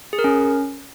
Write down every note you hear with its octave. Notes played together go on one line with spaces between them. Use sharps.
G#4
A#4
C#4